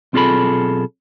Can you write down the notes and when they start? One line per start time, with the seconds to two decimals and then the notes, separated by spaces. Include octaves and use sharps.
0.13 B1 C4 F4 G#4 A4 B5